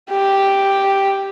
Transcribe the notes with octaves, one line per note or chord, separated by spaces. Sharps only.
G4